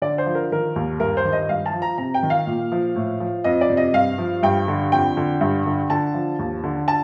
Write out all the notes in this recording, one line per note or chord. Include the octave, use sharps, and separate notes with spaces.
D3 D5
C5
F3
A#4
D#3 A#4
D#2
G2 A#4
C5
D#3
D#5
G2 F5
A5
F3
A#5
C3 A#5
G5
D#3
F5
A#2
F3
A2
F3
F2 D#5
D5
C3
D#5
G2 F5
F3
G2 G5
D3
F2 G5
D3
G2
D3
D3 A5
F3
D#2
D3
A5